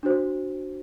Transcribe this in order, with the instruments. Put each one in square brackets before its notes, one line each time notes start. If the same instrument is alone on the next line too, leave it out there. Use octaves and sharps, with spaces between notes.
[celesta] D4 F#4 C5